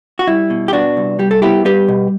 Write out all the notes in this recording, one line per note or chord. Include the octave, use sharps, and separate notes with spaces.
F#4
G3 E4
B2
G4
B3 D4 F#4
C2
G3 G4
A4
B3 E4 G4
G3 G4 B4
B2